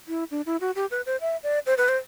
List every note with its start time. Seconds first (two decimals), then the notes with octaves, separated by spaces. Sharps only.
0.08 E4
0.31 D4
0.46 E4
0.61 F#4
0.76 G4
0.91 B4
1.06 C5
1.21 E5
1.43 D5
1.66 C5
1.78 B4
1.89 C5